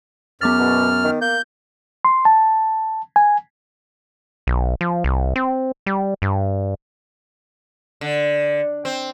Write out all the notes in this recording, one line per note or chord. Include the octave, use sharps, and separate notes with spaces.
F#2 B3 D6 F6 A6
B2
D#3
A#3 G6
C6
A5
G#5
B1
F3
C2
C4
G3
G2
D3
C4